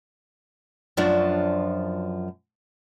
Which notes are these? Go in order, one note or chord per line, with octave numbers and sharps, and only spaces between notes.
F#2 F3 D4